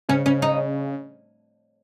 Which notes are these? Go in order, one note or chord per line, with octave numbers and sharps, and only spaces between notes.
C#3 C#4
C#3 C#4
D#4